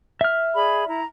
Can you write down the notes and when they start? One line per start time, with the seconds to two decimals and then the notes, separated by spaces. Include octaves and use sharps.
0.21 E5 F6
0.54 G#4 D5 B5
0.87 E4 A#5